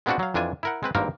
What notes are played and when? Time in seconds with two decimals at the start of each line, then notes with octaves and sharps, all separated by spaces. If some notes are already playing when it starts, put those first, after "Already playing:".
0.06 G#3 B3 C4 D4 F4 F#4
0.19 F#3 F5
0.34 F2 E3 D4 F4 G#5
0.63 E4 A#4 F#5
0.83 G#3 C4 B4
0.95 G#1 G2 A#3 C4 A#4 F5